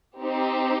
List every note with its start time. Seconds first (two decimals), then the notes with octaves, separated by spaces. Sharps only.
0.21 C4 D#4 G4